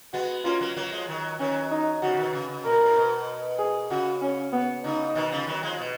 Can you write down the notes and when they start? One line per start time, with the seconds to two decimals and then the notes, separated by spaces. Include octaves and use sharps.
0.13 G#3 B3 F#4
0.45 A#3 C#4 F4
0.61 F#3 A#3
0.77 F#3 A#3
0.92 F3 G#3
1.08 D#3 F#3
1.39 D#3 F#3 C#4
1.71 D#4
2.02 C#3 F3 F#4
2.13 C#3
2.17 B2 D#3
2.33 C#3
2.49 C#3
2.65 A#2 A#4
2.80 G#2
2.96 B2
3.59 G#4
3.90 C#3 F#4
4.22 C#4
4.53 B3
4.84 C#3 D#4
5.15 B2 D#3
5.31 C#3 F3
5.47 D#3 F#3
5.63 F3 G#3
5.79 B2